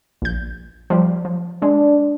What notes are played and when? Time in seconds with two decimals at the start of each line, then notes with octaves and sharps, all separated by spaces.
0.22 A#1 G6
0.90 F3 G3
1.25 F3
1.62 G#3 D4